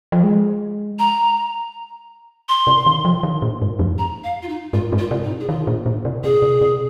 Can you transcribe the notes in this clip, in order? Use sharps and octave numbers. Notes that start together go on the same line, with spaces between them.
F3
G#3
A#5
C6
C3
D#3
F3
D#3
A#2
G#2
F2
A#5
F5
F4
D#4
G#2 F4
G#2
F4
C3
D#4
G#4
D#3 F4
A#2
A#2
C3
C3 G#4
C3
C3